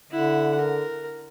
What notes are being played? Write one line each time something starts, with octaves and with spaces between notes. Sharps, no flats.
D3 E4 F#5
A#4